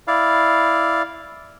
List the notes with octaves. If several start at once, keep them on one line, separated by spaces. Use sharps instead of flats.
E4 D5 F5